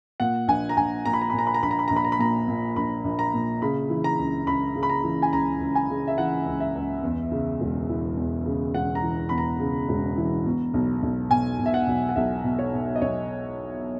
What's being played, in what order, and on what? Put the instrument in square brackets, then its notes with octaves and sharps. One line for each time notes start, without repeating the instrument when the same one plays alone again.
[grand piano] A#2 F#5
A#1 G#5
A#5
A#1 G#5
A#2 A#5
B5
A#5
B5
A#2
A#5
B5
A#5
A#1 B5
A#5
B5
A#1 A#5
B5
A#5
B5
A#2 A#5
A#2
A#1 B5
A#1
A#5
A#2
C#3 B5
E3
A#5
C#2
C#2 B5
C#3
B5
A#5
E3
G#5
C#2 A#5
C#2
G#5
C#3
E5
E3 F#5
C#2
E5
C#2
E2
C#3
E1
E3
E2
C#3
E1 F#5
A#5
E3
E2 B5
A#5
C#3
E1
E3
B2
B1
B1
B2 G#5
B2
E5
F#5
B1
F#5
B1 E5
B2
C#5
B2
D#5
B1 C#5